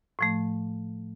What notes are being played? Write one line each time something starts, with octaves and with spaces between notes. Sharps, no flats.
A2 F3 A3